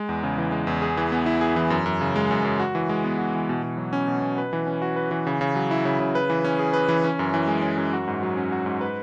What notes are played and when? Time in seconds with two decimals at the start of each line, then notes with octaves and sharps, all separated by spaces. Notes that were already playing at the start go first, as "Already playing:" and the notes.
Already playing: G#3
0.09 E2
0.23 C#3
0.38 E3
0.52 G#3
0.67 E2
0.82 G#4
0.97 E3
1.12 B3
1.26 E4
1.41 G#4
1.56 E3
1.70 F#2
1.86 F#2
2.01 C#3
2.16 G#3
2.31 F#2
2.44 F#2
2.60 F#4
2.75 E3
2.89 G#3
3.04 B3
3.18 F#4
3.34 E3
3.49 B2
3.63 B2
3.78 F#3
3.93 C#4
4.08 B2
4.22 B2
4.38 B4
4.53 E3
4.67 C#4
4.82 F#4
4.96 B4
5.11 E3
5.27 C#3
5.41 C#3
5.55 F#3
5.71 E4
5.85 C#3
6.00 C#3
6.15 B4
6.30 E3
6.44 C#4
6.59 G#4
6.73 B4
6.89 E3
7.04 C#4
7.19 F#2
7.34 E3
7.47 G#3
7.62 C#4
7.77 F#2
7.93 F#4
8.08 G#2
8.23 F#3
8.37 C#4
8.52 F#4
8.66 G#2
8.81 B4